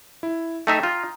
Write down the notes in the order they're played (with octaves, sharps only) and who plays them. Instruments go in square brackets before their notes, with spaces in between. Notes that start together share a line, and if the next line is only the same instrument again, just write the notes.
[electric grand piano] E4
[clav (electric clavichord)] A3 D#4 E5 [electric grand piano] G5 A#5 D#6
[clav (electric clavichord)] F4